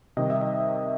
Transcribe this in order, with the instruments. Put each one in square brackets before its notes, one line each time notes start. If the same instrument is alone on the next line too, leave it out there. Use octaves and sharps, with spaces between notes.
[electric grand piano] C3 D#3 G3 D#5
E5
D#5